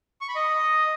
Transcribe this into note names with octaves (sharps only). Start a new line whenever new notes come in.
C#6
B5
D#5